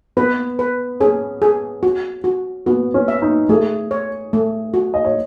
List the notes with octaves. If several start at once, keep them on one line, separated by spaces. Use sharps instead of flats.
B3 B4
B4
C#4 G#4
G#4
F#4
F#4
B3 F#4
C#4
E5
D#4
A3 G#4
C#5
A3
F#4
D#5
C#5